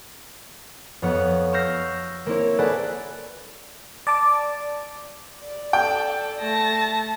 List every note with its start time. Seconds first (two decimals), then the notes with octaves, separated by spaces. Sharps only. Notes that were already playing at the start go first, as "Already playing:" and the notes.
1.02 F2 B3 C#5 F#5 C#7
1.53 C#6 E6 F6 G6 A#6 C7
2.26 A#3 C4 E4 C#5
2.59 G#4 A4 B4 D5 F#5
4.07 D5 A5 D6
5.43 D5
5.73 A4 G5
6.40 A3 A5 A#6